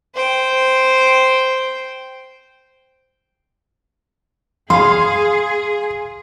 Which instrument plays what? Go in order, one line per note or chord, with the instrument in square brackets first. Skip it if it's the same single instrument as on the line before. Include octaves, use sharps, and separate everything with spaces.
[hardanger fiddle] C5 G5
[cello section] G#4 [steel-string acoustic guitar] F5 [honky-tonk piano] C6